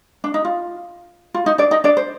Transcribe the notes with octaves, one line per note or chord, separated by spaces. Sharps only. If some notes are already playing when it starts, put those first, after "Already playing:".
D4
D#4
F4
F4
D#4
D4 D5
D#4 D#5
D4 D5
C5